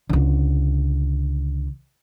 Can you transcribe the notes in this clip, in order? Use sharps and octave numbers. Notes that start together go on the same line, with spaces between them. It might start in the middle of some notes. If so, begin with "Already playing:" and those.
C#2 D3